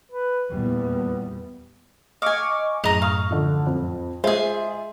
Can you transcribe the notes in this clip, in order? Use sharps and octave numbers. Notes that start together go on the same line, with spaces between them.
B4
E2 A#2 G3 B3
D#5 F5 G#5 C#6 D6
F#2 A2 G#4 D#5 A#5 F7
F5 C#6 D#6
D3 F3
F2
G#3 F4 G#4 C5 E5